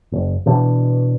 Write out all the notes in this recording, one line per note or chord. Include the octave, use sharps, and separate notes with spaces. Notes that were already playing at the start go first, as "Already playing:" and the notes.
F#1
B2 E3 D4